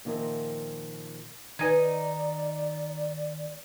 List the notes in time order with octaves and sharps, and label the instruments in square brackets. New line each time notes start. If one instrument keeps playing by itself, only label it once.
[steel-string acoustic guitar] A#2 D#3 F3 A#4 E5
[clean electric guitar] D#3 D#5 [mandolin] D#4 [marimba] B4 G#5 G#6 [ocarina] D5